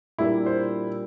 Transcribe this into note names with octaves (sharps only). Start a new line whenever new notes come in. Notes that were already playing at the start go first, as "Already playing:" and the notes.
A#2 G3 A#3 D4 E4
C5